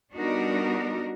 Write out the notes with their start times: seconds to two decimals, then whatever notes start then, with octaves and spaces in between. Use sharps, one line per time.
0.15 G3 B3 D4 D#4 F#4 A#4